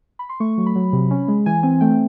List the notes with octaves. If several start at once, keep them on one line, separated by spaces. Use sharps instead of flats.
B5
C6
A3 C#6
F#3
B5
F#3
C3
C#4
G#3
E3 G#5
C4 G#5
A3 G5